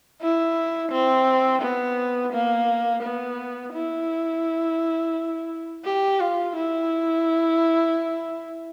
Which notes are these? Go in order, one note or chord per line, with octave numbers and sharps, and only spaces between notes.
E4
C4
B3
A#3
B3
E4
G4
F4
E4